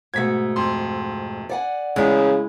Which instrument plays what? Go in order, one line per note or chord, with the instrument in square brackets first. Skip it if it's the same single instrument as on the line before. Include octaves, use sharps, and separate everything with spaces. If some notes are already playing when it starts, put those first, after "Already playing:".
[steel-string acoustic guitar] G#2 B2 A3 [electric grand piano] G#6 B6
[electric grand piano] F2 C6
[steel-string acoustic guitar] D5 F#5 G#5
[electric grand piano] E2 [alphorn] C#3 [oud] G#3 E4